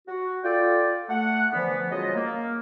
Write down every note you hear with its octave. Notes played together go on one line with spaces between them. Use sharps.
F#4
F4 A4 D5 G5
A3 F#5
D3 E3 F3 B3
C#3 F#3 G3 F4 C#5 D#5
A#3